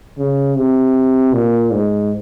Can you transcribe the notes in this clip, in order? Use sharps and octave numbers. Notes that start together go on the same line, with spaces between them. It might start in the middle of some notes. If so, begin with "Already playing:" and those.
C#3
C3
A#2
G#2